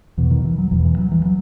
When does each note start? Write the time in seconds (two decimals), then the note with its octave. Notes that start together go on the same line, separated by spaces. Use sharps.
0.17 E2 B2 E3
0.31 D#3
0.45 E3
0.58 F#3
0.71 E2 B2 E3
0.85 E3
0.98 F#3
1.12 E3
1.25 F#3